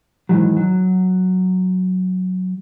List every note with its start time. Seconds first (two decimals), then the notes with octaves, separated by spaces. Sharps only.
0.29 G#2 C3 D#3 E3 F#3
0.57 F#3